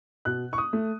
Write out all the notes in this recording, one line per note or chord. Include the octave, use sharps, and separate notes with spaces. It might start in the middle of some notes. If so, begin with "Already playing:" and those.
B2 F#6
C#6
D#6
A3